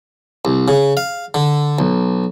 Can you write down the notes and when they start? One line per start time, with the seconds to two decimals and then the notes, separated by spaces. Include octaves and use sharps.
0.45 C2
0.68 C#3
0.97 F5
1.34 D3
1.79 B1